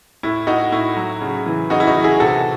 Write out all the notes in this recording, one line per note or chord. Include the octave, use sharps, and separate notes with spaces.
A2 E4
A2 D#4 F#4
A2 E4
F#3
C#3
E3
C#3 D#4 F#4
E4
D#4 F#4
E3
E4 G#4
C3 F#4 A4